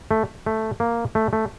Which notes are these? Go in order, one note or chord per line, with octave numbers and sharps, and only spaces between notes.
A3
A3
A#3
A3
A3